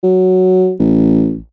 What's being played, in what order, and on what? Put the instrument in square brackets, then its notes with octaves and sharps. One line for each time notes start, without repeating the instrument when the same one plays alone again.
[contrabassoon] F#3
A1